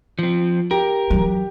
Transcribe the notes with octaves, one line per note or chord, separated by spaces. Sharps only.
F3 C4
G4 A#4
E3 F#3